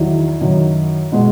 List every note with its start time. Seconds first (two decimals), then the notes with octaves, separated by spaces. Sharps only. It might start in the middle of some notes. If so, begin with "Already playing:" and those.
Already playing: E2 D#3 F#3 E4
0.41 F#2 D#3 F#3
1.12 B2 G#3